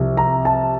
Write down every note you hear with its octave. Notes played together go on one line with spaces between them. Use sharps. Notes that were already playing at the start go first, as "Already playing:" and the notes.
Already playing: C2 C3 F3
A#5
A5